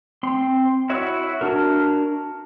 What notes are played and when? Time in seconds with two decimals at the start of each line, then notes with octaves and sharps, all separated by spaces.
0.23 C4 C6
0.89 E4 F#4 C#5 E5
1.41 D4 F#4 A#4